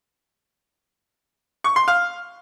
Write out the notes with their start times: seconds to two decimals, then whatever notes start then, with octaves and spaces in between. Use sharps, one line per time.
1.64 C#6
1.76 C6
1.88 F5